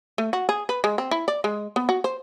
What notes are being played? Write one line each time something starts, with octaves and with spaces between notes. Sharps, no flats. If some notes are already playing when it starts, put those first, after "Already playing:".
A3
F#4
G#4
B4
G#3
C4
E4
D5
G#3
B3
F#4
C5